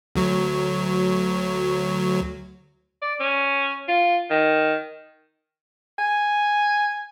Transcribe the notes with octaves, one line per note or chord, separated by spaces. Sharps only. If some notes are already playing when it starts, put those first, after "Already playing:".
D2 F#3
D5
C#4
F4
D#3
G#5